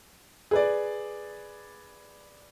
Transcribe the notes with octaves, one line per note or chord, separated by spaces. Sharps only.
G#4 B4 D5